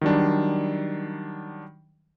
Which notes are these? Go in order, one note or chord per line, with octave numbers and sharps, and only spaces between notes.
D#3 F#3 G3 D4